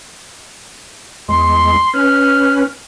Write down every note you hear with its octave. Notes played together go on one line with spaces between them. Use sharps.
E2 G#3 C6
C#4 B4 F6